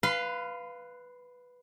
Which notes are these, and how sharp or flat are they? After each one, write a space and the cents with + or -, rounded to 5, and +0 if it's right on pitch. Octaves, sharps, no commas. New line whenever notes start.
B4 +0 F5 -5 C6 -45